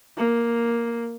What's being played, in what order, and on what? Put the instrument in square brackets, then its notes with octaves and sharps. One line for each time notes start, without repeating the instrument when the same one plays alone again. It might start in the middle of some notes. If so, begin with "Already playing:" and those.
[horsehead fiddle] A#3